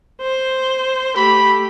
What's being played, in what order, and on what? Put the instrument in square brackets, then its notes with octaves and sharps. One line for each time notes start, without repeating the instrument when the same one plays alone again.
[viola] C5
[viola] A3 G4 [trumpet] B5